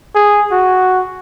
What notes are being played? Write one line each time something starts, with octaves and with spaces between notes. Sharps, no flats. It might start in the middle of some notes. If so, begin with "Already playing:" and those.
G#4
F#4